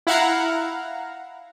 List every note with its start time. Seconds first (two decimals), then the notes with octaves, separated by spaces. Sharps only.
0.07 E4 F5 F#5 A#5